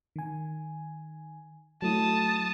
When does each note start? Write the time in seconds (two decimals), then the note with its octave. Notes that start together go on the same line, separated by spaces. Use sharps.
0.16 D#3 G#5
1.82 F#3 A3 E4 A5 D#6